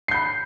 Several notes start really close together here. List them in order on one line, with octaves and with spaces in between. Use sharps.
C7 G6 B5